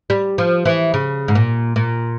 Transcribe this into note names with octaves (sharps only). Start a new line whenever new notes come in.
G3
F3
E3
C#3
G#2
A#2
A#2